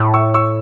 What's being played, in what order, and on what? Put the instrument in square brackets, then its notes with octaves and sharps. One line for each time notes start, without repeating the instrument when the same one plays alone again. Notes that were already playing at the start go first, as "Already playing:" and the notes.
Already playing: [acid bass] A2
[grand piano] C#6 E6
C#6 E6